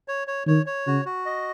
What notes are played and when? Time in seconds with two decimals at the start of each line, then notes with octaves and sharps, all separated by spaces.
0.08 C#5
0.28 C#5
0.47 D#3 C#5
0.66 C#5
0.86 C#3 F#4
1.05 F#4
1.26 D#5